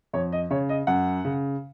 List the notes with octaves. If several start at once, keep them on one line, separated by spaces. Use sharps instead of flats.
F2 C#5
D#5
C#3 C#5
D#5
F#2 F#5
C#3